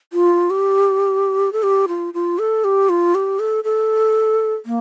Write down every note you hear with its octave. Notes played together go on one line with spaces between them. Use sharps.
F4
G4
A4
G4
F4
F4
A4
G4
F4
G4
A4
A4
A#3